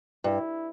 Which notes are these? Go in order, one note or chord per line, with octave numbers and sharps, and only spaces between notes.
G2 E4